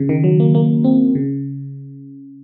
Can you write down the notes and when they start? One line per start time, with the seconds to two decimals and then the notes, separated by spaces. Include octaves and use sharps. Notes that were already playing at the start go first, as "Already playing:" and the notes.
Already playing: C#3
0.09 D#3
0.24 F#3
0.40 A#3
0.55 A#3
0.84 C4
1.15 C#3